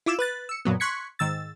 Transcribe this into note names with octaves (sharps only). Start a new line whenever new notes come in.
E4 F4 D6 E6 E7
B4 F#6 A6
E6 C#7
F#2 A#2 F#3 B3
C6 C#6 F#6 G#6 B6 C#7
G#2 D#3 E6 A6